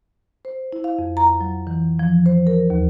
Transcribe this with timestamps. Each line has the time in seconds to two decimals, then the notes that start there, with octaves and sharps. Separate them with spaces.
0.45 C5
0.73 E4
0.84 F5
0.99 F2
1.17 A#5
1.41 F#3
1.67 E3
1.99 F3
2.26 C5
2.47 A#4
2.70 D#2